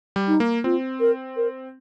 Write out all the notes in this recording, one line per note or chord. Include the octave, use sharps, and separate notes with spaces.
G3
D#4
A#3
C4 F4
A#4
A#4